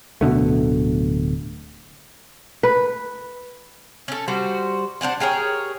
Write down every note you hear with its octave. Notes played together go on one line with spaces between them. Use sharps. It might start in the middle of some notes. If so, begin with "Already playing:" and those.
D1 B2 D3 A3
B4
C#4 A4
G3 F#4 C5
D4 C5 F#5 G#5
G4 G#4 A#4 C#5